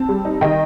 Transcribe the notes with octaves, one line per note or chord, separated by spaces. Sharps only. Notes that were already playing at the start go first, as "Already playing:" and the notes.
Already playing: C4 A5
G3
D#4
D#3 D#5 G5